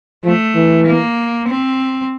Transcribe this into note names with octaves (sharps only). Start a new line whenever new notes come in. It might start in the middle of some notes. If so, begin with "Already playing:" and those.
F3 A3
E3
A#3
C4